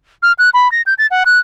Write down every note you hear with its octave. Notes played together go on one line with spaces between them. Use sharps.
F6
F#6
B5
A#6
G6
A6
F#5
F#6